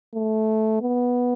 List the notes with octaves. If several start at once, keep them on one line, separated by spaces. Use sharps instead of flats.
A3
B3